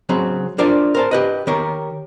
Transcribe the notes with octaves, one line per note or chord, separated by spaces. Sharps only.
C#3 F#3 C4
D4 F4 A#4 C5 D5 E5
A#4 C5 A5
G4 B4 D#5
D#3 G4 A#4 C#5